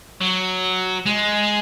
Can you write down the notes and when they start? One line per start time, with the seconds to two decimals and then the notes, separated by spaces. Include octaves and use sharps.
0.21 F#3
1.06 G#3